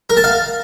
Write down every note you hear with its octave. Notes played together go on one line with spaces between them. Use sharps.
A#4
A5
F5